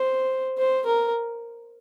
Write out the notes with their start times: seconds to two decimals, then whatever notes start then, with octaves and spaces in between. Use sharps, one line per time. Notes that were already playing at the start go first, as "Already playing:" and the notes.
Already playing: C5
0.58 C5
0.86 A#4